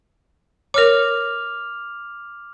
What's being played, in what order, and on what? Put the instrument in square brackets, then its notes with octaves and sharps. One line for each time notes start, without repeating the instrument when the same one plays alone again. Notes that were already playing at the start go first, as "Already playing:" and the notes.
[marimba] A#4 C#5 [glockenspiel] D6 F6 F7